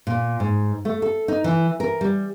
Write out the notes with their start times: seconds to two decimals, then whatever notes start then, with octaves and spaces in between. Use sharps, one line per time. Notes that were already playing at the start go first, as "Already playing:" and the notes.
0.07 A#2
0.40 G#2
0.85 A3
1.02 A4
1.28 D#4
1.44 E3
1.80 A#4
2.01 G3